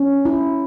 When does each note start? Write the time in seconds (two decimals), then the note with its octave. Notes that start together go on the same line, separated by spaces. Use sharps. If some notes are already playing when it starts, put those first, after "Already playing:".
Already playing: C#4
0.25 E4